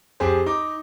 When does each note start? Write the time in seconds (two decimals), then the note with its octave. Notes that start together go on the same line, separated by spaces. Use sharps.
0.20 F2 G4 G#4 C5
0.46 D#4 D6